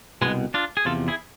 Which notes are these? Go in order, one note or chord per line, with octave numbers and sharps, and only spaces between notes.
C2 B2 G#3 B3
D4 F4
G#4
E2 C3 F3 F4 A4
E4 G#4